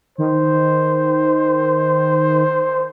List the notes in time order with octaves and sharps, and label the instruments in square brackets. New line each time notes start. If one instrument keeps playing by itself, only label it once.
[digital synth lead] D#3 [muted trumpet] C5